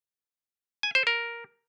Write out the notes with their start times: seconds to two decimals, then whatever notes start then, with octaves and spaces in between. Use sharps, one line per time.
0.83 G#5
0.95 C5
1.07 A#4